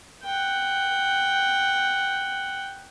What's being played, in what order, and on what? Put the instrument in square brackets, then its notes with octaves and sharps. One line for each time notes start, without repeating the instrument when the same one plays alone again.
[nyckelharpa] F#5 G5